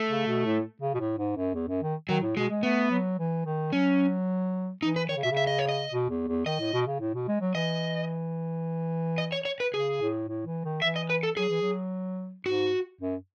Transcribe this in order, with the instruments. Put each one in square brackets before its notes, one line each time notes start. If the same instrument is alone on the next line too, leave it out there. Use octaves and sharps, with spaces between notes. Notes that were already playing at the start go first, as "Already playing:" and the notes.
Already playing: [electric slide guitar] A3
[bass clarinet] C#3
B2
A2
C#3
B2
A2
G#2
F#2
E2
F#2
D#3
[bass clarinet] D#3 [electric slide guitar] F#3
[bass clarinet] A2
[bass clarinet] B2 [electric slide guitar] G#3
[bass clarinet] G#3
[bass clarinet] A3 [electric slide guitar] B3
[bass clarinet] F#3
E3
D#3
[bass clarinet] F#3 [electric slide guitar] C#4
[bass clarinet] E3 [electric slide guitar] D#4
[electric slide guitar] B4
[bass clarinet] D#3 [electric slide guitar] C#5
[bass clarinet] C#3
[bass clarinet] B2 [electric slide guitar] E5
[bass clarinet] C#3
[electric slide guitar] E5
D#5
C#5
D#5
[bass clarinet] B2
E2
E2
[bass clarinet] D#3 [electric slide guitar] D#5
[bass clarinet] A2
B2
C#3
A2
B2
G#3
F#3
[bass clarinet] E3 [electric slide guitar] D#5
[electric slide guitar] D#5
C#5
C#5
B4
[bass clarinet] C#3 [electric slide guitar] G#4
[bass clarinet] A2
A2
E3
D#3
[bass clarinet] E3 [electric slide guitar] E5
[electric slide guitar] D#5
B4
A4
[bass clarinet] F#3 [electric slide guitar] G#4
[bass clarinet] E3
F#3
[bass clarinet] G#2 [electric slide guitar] F#4
[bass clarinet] F#2